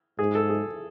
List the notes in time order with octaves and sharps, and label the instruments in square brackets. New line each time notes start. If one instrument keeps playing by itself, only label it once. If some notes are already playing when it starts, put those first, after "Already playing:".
[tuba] G#2 [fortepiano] G#4
[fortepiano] A4
G#4